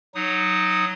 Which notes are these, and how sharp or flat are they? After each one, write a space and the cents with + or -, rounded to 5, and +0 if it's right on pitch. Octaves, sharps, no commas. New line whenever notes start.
F#3 +0 D#4 +0 D#6 +0